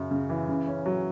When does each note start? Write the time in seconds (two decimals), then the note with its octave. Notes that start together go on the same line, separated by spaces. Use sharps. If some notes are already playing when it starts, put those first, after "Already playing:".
Already playing: F#2 C#3
0.11 C#3
0.30 E3
0.48 C#3
0.67 C#4
0.86 F#3